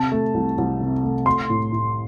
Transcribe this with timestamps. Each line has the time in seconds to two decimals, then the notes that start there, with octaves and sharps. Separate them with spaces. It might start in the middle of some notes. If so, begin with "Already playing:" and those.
Already playing: C3 A5
0.12 A3
0.34 C2
0.58 C2
0.81 C3
1.03 A3
1.26 A3 C6
1.50 A2
1.72 A2